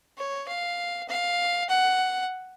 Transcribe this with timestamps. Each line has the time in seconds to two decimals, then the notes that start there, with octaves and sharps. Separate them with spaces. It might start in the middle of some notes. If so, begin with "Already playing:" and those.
0.18 C#5
0.48 F5
1.08 F5
1.69 F#5